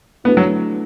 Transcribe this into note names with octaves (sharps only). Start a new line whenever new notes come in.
E3 A3 B3 D4 F#4
F#3